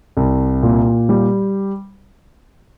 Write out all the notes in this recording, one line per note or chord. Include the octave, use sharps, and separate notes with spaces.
C2
A#2
G3